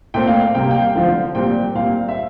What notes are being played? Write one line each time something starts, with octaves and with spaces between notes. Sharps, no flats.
A#2 A3 C4 G5
F5
F5
C3 G3 A#3 G5
G5
F5
D3 F3 C4 F5
A#2 G3 C4 G5
A#2 G3 C4 F5
E5